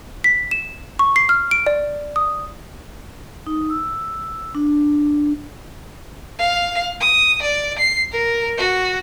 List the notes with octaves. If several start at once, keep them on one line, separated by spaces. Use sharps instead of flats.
B6
E7
C#6
C7
F6
D7
D5
D#6
D#4
E6
D4
F5
D#6
D5
C7
A#4
F#4